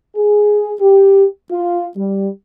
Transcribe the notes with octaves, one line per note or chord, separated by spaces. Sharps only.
G#4
G4
F4
G3